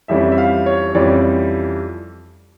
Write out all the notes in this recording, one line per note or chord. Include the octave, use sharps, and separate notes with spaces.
F2 E3 G3 C#4 E5
E5
F5
C#5
F2 E3 G3 C#4 D5